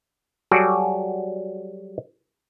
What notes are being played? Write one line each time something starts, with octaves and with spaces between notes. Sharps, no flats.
F#3 G3 F#4 G#4 A4 D5